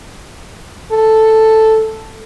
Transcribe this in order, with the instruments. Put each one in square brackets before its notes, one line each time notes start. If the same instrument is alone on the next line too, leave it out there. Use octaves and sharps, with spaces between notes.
[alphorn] A4